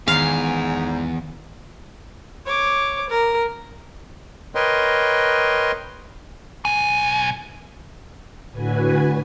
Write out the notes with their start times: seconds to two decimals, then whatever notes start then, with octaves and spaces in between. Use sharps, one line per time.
0.08 E2 G#2 D#3 F5
2.46 C#5 D6
3.10 A#4
4.55 A#4 B4 C#5 D#5 G5 C6
6.65 B1 G#5
8.52 A2 D3 F#4 B4 G#5